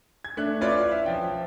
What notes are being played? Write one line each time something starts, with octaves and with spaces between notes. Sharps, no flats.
G#6
A3 D4 F#6
C#4 E4 F4 B4 C#5 D5
E5
F3 G5